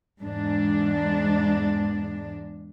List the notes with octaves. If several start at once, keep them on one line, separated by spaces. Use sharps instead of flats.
E2 G#2 G#3 D4